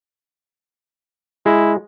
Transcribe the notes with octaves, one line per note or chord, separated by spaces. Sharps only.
G#3 E4